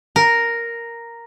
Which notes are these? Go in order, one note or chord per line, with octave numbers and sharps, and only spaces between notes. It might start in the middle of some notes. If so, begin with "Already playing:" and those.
A#4